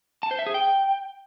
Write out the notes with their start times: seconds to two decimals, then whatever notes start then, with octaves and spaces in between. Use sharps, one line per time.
0.23 A5
0.31 C5
0.39 E5
0.47 G#4
0.54 G5